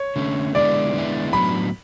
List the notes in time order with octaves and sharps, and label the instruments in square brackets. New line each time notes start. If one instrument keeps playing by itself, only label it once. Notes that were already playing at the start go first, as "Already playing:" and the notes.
Already playing: [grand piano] C#5
[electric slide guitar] D3 A3 C#4
[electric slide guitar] D3 G#3 B3 E4 [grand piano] D5
[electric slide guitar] D3 G#3 B3 E4
[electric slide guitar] A2 F#3 B3 D4 [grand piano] B5